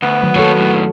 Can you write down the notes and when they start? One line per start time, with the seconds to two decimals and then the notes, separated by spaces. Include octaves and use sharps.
0.02 D2 B3
0.23 D#3 F#3 A3
0.36 A#3 F#4 A4 C#5
0.57 F#2 A2